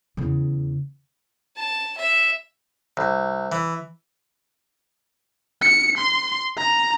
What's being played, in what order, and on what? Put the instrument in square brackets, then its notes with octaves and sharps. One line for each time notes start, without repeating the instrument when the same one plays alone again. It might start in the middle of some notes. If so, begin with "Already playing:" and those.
[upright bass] E2 C#3
[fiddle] A5
E5
[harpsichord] C2
E3
[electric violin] C#7
C6
A#5